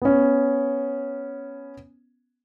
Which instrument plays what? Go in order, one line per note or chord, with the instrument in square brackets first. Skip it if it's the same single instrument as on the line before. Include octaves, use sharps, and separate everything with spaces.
[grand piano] B3 C#4